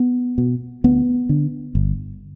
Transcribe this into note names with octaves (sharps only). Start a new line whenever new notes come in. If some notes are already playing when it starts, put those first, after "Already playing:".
Already playing: B3
B2
D2 B3
D3
G1